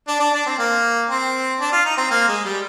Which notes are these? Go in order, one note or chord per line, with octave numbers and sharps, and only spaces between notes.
D4
D4
D4
C4
A#3
C4
D4
F4
D#4
C4
A#3
G#3
G3